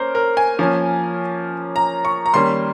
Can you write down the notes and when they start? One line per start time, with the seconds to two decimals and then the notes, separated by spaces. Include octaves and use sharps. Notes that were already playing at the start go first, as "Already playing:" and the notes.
Already playing: A#3 C#4 A#4 C5
0.15 A#4
0.37 G#5
0.59 F3 A#3 C#4
1.76 A#5
2.05 C#6
2.26 A#5
2.34 D#3 G3 A#3 C#4 C6